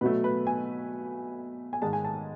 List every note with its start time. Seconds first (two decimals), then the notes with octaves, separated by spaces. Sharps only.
0.01 B2 F#3 A3 B4
0.24 B4
0.47 G#5
1.73 G#5
1.82 G#2 D#3 G#3 A5
1.93 G#5
2.04 A5